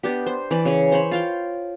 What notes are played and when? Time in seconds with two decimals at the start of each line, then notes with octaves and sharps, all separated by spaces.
0.03 B3 D4 G4
0.26 C5
0.51 E3 D5 B5
0.65 C#3 G#4
0.92 C5 C#5 B5
1.11 F4 F5 G5